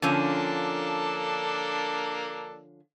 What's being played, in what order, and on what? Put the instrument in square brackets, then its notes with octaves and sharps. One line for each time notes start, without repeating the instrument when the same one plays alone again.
[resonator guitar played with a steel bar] D3 F3 C#4 [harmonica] A#3 D4 A4